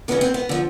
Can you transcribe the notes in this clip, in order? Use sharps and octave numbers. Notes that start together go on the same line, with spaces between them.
E2 C#3 E3 B3
C4
B3
D3 F3